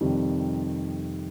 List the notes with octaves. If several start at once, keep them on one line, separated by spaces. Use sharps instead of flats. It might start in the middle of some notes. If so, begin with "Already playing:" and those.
F2 C3 D#3 G3